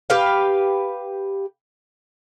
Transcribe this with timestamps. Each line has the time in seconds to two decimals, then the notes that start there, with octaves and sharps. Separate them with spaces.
0.10 G4 B4 F5